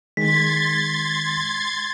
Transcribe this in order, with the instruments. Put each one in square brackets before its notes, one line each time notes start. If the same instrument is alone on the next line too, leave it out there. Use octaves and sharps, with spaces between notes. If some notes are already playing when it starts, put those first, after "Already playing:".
[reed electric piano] D#3 G#3 [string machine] C6 G#6 A6 [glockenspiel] B6